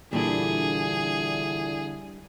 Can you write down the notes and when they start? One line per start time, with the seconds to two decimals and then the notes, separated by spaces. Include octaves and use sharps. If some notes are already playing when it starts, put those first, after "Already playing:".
0.13 A#2 D3 E3 G3 D4 E4 G#4